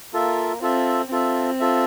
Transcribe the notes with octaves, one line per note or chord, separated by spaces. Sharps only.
A#3 F4 A4 E5
C4 F4 A4 E5
C4 F4 A4 E5
F4 A4 E5